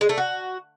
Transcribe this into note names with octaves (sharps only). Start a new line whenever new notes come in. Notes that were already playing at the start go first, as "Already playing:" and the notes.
G#3
A3
F#4